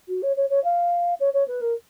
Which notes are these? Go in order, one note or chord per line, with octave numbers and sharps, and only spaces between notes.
F#4
C#5
C#5
C#5
F5
C#5
C#5
B4
A#4